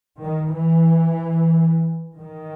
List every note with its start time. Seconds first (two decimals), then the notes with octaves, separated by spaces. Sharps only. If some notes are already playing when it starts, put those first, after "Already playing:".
0.21 D#3
0.53 E3
2.19 D#3